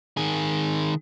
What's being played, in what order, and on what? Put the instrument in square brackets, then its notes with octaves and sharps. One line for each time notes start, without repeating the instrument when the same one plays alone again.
[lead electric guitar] D#3 G#4